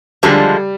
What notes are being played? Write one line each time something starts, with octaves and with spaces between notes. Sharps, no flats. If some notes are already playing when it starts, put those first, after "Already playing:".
D3 F3 G3 G#3 D4